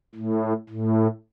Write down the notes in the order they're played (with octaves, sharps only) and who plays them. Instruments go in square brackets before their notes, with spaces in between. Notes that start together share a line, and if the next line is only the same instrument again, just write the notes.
[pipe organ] A2
A2